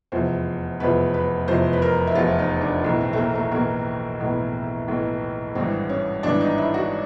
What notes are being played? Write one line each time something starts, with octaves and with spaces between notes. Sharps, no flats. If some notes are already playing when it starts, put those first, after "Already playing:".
F1 E2 C3 F3 C5
F1 E2 C3 F3 B4
B4
F1 E2 C3 F3 C5
B4
A#4
E4
F1 E2 C3 F3 F4
D#4
D4
B1 A2 E3
C4
A3
A#3
A3
B1 A2 E3 A#3
B1 A2 E3 B3
B1 A2 E3
G#1 G2 E3 C4
C#4
G#1 G2 E3 D4
D#4
E4
F#4